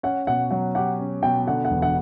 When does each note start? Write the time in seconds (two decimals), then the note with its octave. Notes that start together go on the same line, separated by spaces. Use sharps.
0.03 C#4 F#5
0.27 B2 F#5
0.51 F#3 F#5
0.75 G4 F#5
0.99 C#4
1.23 B2 G5
1.47 D3 F#5
1.65 F#5
1.71 E1
1.82 F#5